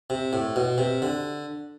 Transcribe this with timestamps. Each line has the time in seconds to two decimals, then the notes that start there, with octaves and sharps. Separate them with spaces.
0.10 C3
0.33 A2
0.56 B2
0.78 C3
1.02 D3